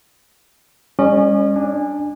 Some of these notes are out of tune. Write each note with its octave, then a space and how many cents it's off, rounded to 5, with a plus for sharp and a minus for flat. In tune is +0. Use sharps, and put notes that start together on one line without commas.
G#3 -45 C#4 +0 D#5 -45
D4 +0 G#5 -20